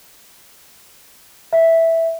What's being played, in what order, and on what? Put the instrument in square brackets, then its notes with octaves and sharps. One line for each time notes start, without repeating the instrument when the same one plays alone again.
[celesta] E5